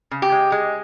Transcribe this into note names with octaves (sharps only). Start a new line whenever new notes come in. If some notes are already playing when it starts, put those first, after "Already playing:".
C#3
G4
G#3
G#3